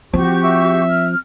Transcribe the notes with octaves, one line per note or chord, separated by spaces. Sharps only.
F3 C4 F#4 G4 C#6
E5
F6